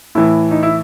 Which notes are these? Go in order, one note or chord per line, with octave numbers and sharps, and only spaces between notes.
A2 E3 E4
D#4
E4